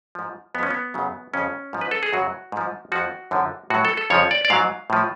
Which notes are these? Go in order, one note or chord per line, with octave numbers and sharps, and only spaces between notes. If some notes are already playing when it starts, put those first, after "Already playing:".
G#2 F3
F2 F3 B3 C#4
B3
F#2 C#3 F#3
F2 C#3 F3 C#4
G#2 F3
B4
A4
G#4
F#2 C#3 F#3 F#4
G#2 F3
F2 F3 F#4
F#2 D3 F3
A2 F#3 F#4
A4
A4
F2 C#3 F3 C#5
D5
D5
G#2 F#3 F5
A2 F3